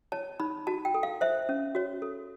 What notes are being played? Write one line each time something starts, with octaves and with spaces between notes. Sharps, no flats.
C#5 A5
D#4 B5
F#4 A5
G5
A4
F5
C5 E5
C#4
F#4 C#5
A4